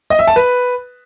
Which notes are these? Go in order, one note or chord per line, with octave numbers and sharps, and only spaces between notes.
D#5
E5
A5
B4